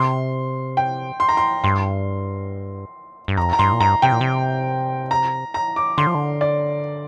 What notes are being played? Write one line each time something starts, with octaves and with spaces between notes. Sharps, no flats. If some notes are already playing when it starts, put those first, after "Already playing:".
Already playing: C3 C6
G5
C6
A#5
C6
G2 C6
G2
F2 A#5
A#5
G2 C6
A#2
G2 A#5
C3 G5
A#2
C3
A#5
A#5
D6
D3 C6
F3
D3
D5